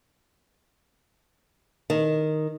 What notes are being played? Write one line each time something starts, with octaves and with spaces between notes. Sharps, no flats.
D#3